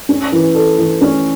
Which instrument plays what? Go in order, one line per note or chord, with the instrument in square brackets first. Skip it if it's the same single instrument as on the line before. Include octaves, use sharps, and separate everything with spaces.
[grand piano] C#4
E3
A4
E3
C#4